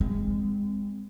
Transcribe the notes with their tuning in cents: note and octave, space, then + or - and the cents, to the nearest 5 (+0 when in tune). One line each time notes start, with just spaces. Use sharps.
G#3 -30 C4 -25